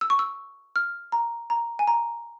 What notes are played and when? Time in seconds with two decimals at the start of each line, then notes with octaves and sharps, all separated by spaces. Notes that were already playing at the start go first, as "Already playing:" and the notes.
0.01 E6
0.10 C#6
0.19 E6
0.76 F6
1.12 A#5
1.50 A#5
1.79 G#5
1.87 A#5